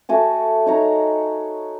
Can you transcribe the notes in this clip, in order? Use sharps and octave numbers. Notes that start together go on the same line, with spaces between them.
A3 F#4 G#5 A5
D#4 C#5 A#5